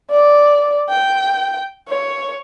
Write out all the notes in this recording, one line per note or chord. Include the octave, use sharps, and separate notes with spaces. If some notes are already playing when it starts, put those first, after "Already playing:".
D5
G5
C#5